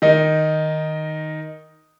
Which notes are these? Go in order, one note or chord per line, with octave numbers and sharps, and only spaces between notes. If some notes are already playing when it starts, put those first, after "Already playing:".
D#3 D#4